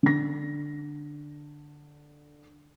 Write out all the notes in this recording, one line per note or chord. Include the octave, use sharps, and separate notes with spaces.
D3 A#6